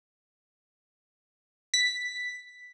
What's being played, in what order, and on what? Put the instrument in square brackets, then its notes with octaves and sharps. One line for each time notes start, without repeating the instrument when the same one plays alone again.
[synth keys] B6